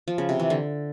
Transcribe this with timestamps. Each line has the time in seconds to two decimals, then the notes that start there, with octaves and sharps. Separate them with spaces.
0.08 F3
0.18 C#3
0.29 C3
0.40 E3
0.50 D3